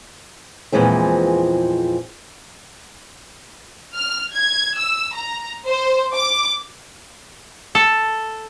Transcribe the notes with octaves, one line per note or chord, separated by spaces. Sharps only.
E2 A#2 E3 F3 G#3 C4
F6
G#6
E6
A#5
C5
D6
A4